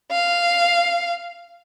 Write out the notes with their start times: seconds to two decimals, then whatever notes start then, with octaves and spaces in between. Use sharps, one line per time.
0.12 F5